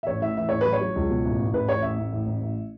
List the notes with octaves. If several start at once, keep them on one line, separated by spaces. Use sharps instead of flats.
E5
A1 C#5
A2 E5
E3 E5
A1 C#5
F#3 B4
C#5
F#3
C#2
B2
A1
A1
A1 B4
A1 C#5
A1 E5
A1
A2
A1
A1